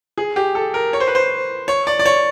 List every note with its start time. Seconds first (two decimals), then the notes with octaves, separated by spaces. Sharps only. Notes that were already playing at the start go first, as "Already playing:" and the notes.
0.18 G#4
0.36 G4
0.55 A4
0.74 A#4
0.93 C#5
1.00 C5
1.07 B4
1.15 C5
1.68 C#5
1.87 D5
1.99 D5
2.05 C#5